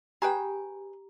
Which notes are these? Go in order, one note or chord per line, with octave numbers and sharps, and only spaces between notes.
G4 G#4 B4 G5 A#5